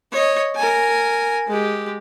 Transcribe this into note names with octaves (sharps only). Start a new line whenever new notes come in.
C#5 D#5
A#4 G#5
G#3 G4